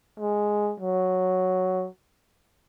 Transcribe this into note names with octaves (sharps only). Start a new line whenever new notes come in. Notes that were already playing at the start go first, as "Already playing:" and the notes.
G#3
F#3